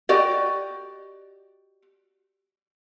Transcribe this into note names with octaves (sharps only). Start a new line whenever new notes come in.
F#4 G4 D5 D#5